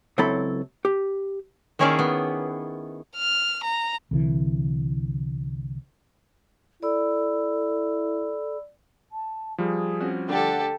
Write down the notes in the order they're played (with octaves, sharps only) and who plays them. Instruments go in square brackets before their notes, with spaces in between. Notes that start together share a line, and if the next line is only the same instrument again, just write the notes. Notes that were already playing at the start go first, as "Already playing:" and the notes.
[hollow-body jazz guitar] C#2 F#3 C4 E4 A4 B5
G4
[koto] D#3 A#3 C#4 E4 G#4 D5
B3
[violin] F6
A#5
[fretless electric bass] C2 D3 E3
[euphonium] E4 [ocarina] A4 [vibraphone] D5 B5 E6
[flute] A5
[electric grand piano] F3 G3 [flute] G#4
[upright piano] C4 C#4 F#4
[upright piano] D3 A3 D4 [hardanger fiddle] G4 A4 [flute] F#5